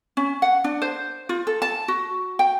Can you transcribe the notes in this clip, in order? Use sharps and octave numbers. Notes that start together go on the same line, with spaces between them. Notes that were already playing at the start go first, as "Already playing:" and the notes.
C#4
F#5
D4
C5
F4
A4
A5
F#4
G5